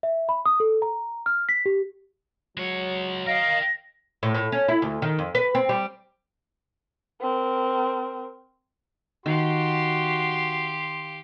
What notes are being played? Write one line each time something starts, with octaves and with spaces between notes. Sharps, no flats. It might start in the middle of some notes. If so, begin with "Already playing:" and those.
E5
B5
D#6
A4
A#5
F6
B6
G4
F#3 G#3 C#5
A#4 D#5 F5 G5 A#6
A2
A2
C#4
E4
D2
D#3
F2
B4
C4
G3
C4 A#4
D#3 F#4 G4 F5 C6